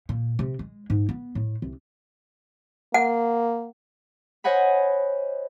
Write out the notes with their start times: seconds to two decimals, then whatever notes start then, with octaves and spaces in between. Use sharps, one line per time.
0.09 A#2
0.39 C3
0.59 G#3
0.90 G#2
1.09 B3
1.35 A2
1.62 C2
2.94 A#3 F#5
4.44 C5 C#5 D#5 F#5 G#5 B5